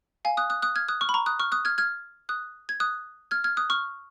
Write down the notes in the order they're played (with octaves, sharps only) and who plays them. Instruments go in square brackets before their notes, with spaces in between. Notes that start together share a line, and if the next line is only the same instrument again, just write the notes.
[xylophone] F5 G#5
D#6 F#6
D#6 F#6
D#6 F#6
F6 G#6
D#6 F#6
C#6 F6
B5
A#5 C#6
D#6 F#6
C#6 F6
D#6 F#6
F6 G#6
F6 G#6
D#6 F#6
G#6
D#6 F#6
F6 G#6
F6 G#6
D#6 F#6
C#6 F6